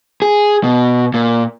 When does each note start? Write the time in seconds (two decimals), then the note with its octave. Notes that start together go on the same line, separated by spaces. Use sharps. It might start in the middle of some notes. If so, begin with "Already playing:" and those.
0.22 G#4
0.64 B2
1.14 A#2